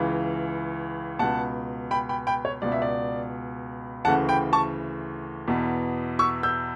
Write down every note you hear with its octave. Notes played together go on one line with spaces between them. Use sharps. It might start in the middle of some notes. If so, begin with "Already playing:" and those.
Already playing: C#2 C#3 E3
C#2 B2 F#5 A5
G5 B5
G5 B5
G5 B5
C#5
C#2 B2 D5
E5
D5
D2 C#3 E3 F#5 A5
G5 B5
A5 C#6
E2 B2
C#6 E6
E6 G6